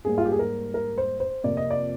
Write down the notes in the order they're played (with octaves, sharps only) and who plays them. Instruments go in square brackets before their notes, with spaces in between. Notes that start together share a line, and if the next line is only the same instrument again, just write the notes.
[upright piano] G#2 G3 A#3 G#4
F4
G4
G#4
A#4
A#4
C5
C5
F2 C3 F3 A#3 D5
D#5
D5